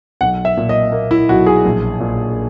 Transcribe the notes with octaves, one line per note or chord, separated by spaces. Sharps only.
B1 F#5
E5
A#2
D#5
A#3
E4
B1 F#4
G#4
A#1
A#2